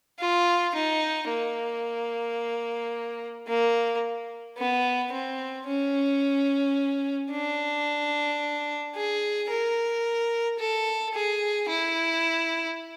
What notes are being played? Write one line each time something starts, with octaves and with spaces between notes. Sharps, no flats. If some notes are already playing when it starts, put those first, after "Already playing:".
F4
D#4
A#3
A#3
B3
C4
C#4
D4
G#4
A#4
A4
G#4
E4